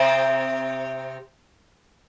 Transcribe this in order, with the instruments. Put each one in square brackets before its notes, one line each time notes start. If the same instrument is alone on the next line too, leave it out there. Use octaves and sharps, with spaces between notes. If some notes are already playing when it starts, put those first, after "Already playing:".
Already playing: [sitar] C3 C4